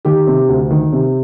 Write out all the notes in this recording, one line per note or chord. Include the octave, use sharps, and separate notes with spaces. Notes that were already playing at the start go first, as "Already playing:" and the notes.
D#3 G4
C3
D2
D#3
C3